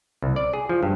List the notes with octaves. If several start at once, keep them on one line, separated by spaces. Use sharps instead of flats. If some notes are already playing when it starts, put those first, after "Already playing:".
C2
D5
G#4
F3
G2